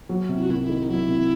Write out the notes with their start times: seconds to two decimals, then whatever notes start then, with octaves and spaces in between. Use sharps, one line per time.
0.09 F#3
0.29 C3
0.36 E4
0.43 F#4
0.49 C2 E4
0.63 E4
0.69 D#3
0.83 D#4
0.89 F#3 E4
1.09 C3